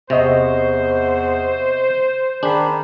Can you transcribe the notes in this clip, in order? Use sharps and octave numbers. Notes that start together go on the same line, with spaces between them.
E2 C3 C5 D#5 E5 C#6
D#3 D4 G#4 B5